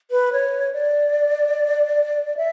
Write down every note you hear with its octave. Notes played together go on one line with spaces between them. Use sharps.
B4
C#5
D5
E5